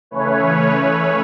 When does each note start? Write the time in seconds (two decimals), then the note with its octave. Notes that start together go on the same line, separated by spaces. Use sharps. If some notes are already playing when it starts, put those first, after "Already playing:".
0.11 C#3 E3 A3 C#4 B4 C#5
0.74 B4 C#5